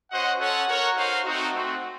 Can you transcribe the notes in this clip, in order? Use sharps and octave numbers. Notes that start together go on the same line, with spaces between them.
C#4 F#4 C5 D#5 F#5
C#4 A4 C#5 F#5
F#4 A#4 C#5 F#5
D#4 F#4 C5 F5
A3 C4 D#4 F#4
A3 C4 F#4